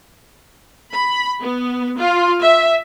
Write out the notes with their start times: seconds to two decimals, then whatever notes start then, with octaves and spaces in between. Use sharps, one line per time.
0.93 B5
1.42 B3
1.98 F4
2.42 E5